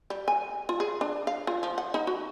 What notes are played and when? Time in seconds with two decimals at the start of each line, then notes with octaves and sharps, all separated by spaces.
0.10 G3
0.28 G#5
0.69 F4
0.80 G#4
1.01 D4
1.27 F5
1.47 F4
1.63 F3
1.78 F#5
1.94 D#4
2.07 F#4